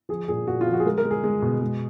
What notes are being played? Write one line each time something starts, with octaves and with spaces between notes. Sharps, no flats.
F3 G#4
A#2 G#4
A#2 F#4
F4
F3
F#4
G#4
G#3 A#4
A#4
G#3
G#4
G#3
B2
G#3